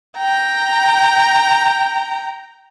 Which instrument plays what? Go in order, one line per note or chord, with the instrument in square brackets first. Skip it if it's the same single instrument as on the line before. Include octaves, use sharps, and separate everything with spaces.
[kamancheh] G5 A#5